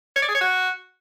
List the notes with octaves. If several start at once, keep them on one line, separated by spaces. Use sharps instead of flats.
C#5
D5
G#4
C#5
F#4